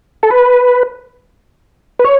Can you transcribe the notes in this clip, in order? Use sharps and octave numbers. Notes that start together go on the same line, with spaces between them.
A4
B4
B4
C#5